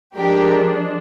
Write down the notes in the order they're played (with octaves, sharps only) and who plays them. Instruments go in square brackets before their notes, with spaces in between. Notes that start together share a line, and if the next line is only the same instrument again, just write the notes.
[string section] F3 G#3 D4 G4 A#4